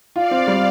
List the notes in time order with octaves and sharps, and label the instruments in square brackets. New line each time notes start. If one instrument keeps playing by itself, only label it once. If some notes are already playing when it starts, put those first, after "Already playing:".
[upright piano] F4 [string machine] D5 F5
[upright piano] C4
G3